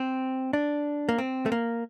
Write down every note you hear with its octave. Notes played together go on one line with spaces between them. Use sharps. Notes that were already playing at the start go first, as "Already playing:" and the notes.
Already playing: C4
D4
A#3
C4
A3
A#3